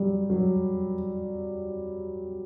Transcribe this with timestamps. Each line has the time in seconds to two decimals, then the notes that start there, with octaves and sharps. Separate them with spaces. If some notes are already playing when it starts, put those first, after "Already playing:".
Already playing: F#3 G3
0.30 F#3